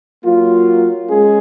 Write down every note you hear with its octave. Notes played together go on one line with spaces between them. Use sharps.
F#3 A#3 F4
G#3 C#4 G#4